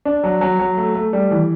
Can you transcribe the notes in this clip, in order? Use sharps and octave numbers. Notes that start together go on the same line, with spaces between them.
D4
F#3
F#3
F#3
A3
A3
G3
E3